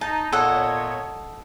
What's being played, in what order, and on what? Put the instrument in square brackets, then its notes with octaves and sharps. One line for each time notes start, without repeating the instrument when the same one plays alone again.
[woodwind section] D#4 [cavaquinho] A5
[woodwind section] A#2 B3 C#5 [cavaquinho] A4 D#5 F#5